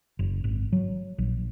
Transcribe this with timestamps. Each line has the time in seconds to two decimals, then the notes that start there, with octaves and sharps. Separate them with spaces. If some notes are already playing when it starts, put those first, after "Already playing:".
0.19 F#1
0.44 G#1
0.72 F#3
1.18 A#1